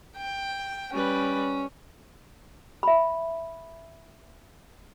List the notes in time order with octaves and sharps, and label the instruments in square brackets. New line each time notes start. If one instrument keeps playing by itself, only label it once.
[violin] G5
[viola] G3 B4 [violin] C#4
[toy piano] E5 B5